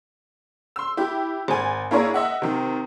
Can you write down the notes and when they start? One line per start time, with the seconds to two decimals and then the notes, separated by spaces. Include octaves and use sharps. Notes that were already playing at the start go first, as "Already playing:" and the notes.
0.76 C6 E6
0.97 E4 G4
1.48 G#1 G#5
1.91 A#3 D4 E4 G#4 A#4 C#5
2.14 D#5 E5 F#5
2.42 C3 D#3